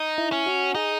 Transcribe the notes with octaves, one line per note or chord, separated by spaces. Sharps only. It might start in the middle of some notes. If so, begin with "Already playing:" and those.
Already playing: D#4
E4
C#4
F#4
D#4 G#4